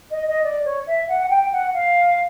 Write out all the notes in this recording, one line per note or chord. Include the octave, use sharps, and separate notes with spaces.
D#5
D#5
D5
C#5
E5
F#5
G5
F#5
F5